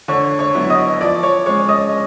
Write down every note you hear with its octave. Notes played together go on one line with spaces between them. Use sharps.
D3 C#5 C#6
C#5 C#6
F#3 B3 E4
D#5 D#6
F3 D5 D6
C#5 C#6
G#3 C#4 C#5 C#6
D#5 D#6